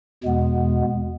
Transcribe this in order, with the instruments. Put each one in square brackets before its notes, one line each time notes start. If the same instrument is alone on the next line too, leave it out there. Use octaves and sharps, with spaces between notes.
[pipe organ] E2 B2 G#3 B3